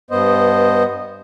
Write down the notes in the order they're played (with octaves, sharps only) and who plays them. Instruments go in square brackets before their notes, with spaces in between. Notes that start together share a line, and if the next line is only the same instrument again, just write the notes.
[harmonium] G2 B3 C5 D#5